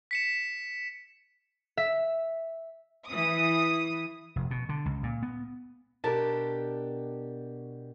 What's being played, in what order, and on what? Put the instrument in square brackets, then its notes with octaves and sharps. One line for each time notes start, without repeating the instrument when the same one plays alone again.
[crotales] B6 C#7 E7
[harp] E5
[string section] E3 D#6
[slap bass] F1
B2
D3
C#2
A#2
B3
[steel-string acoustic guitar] B2 D4 G4 [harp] A#4 A5